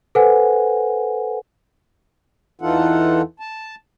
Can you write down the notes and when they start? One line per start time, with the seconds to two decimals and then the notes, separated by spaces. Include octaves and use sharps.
0.15 A4 B4 C5 F#5 G#5
2.62 E2 E3 D#4 F4 A4 F#5
3.40 A5